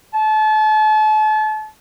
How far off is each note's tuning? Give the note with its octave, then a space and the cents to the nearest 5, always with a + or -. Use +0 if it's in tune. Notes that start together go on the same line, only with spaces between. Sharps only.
A5 -35